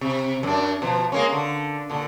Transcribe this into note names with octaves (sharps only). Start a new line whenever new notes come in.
C3
F#2 D4
B2 F3
G#3 A#3 C#4
D3
A#2 D3